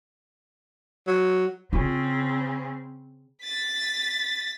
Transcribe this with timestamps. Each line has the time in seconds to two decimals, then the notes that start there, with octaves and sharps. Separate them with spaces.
1.08 F#3
1.73 C#3 C4 F4
3.44 A6 B6